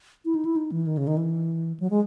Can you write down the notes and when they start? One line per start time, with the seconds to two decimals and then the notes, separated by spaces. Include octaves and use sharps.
0.25 E4
0.35 D#4
0.45 E4
0.56 D#4
0.72 E3
0.86 D#3
0.97 C#3
1.07 D#3
1.17 E3
1.80 F#3
1.90 G#3